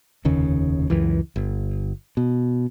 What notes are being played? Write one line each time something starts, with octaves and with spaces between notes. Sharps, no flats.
F1 D#2 C#3
C#2 F#2 E3
G1
B2